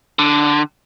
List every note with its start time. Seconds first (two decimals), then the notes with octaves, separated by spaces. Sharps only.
0.19 D3